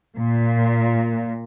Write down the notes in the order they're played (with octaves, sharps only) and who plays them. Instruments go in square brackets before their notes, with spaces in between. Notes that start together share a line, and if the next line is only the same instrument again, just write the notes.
[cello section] A#2